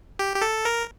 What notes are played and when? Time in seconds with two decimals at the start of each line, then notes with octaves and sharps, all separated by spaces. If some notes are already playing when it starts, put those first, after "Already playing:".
0.19 G4
0.36 G4
0.42 A4
0.65 A#4